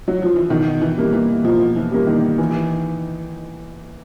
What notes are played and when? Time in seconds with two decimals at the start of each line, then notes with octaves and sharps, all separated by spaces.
0.08 F#3
0.22 F3
0.36 E3
0.50 B2 D#3
0.81 E3
0.97 G3 A#3
1.13 E3
1.44 B2 F3
1.76 E3
1.91 G3 A#3
2.07 D#3
2.38 E3